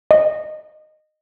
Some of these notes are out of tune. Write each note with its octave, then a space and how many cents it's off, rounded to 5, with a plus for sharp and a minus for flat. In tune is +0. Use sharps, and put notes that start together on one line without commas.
D#5 -15